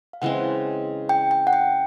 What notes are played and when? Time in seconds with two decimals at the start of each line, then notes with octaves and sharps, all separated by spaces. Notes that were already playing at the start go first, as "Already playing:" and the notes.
0.13 F5
0.22 C#3 E3 G#3 C4 F#5
1.09 G5
1.31 G5
1.47 F#5
1.53 G5